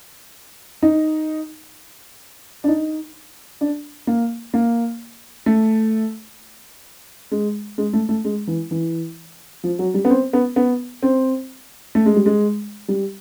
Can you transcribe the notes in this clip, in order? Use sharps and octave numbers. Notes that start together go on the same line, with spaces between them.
D#4
D4
D#4
D4
A#3
A#3
A3
G#3
G#3
A3
A3
G#3
E3
E3
F3
F#3
G3
B3
C4
B3
B3
C4
A3
G#3
G3
G#3
G3